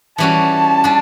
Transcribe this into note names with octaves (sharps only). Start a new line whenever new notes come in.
E3 G3 C#4 F#4 A5
G3 D4